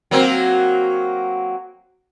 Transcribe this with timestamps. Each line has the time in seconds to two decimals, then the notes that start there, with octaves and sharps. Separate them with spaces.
0.11 F#3 A#3 C4